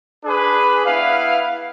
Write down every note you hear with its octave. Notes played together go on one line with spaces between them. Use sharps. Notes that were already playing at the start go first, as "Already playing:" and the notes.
D4 G#4 B4
B3 E4 B4 F5